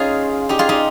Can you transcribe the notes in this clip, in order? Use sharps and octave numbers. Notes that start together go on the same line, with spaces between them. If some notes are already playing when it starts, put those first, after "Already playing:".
Already playing: C#4 D#4 F4 G#4
D#4 G4
F4 G#4
D#4 G4